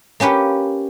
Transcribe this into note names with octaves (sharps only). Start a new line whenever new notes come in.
A#3 C#4 G4 B4